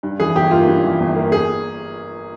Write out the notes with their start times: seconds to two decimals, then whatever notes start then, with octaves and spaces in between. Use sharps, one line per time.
0.03 G2
0.19 E3 G#4
0.35 G1 G4
0.51 A#3 F4
0.67 G2
0.84 E3
1.00 G1
1.16 A#3
1.32 G#4